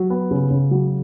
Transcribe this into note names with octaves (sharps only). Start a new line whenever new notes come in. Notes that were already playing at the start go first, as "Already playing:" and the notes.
Already playing: F#3
B3
C#3
C#3
F#3